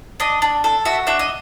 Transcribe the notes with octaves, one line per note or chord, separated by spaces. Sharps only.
D4 D#5
D4
A4
F#4 E5
D4 E5
D#5